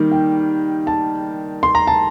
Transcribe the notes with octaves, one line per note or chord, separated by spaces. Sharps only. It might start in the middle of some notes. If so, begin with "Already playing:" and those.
Already playing: D#3 G3 A#3
G5
A5
C6
A#5
A5